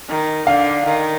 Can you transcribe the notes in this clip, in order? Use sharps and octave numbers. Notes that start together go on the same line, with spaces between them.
D#3
D3 F5
D#3